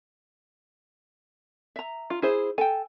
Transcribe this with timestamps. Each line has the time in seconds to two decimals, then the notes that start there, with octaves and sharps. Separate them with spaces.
1.76 E5 A#5
2.10 F4
2.22 E4 G#4 C5
2.58 A4 G5 G#5